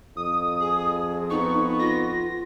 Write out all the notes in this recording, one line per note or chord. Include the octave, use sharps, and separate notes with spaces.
F2 D#6
G#4
B3 D#4 C#6
F4 A#6